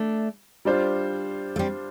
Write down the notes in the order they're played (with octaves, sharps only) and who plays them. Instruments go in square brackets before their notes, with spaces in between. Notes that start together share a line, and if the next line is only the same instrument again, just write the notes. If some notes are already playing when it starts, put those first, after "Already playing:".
Already playing: [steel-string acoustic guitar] A3 D4
[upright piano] G3 D4 F4 C5
[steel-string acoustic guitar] A3
G3 C4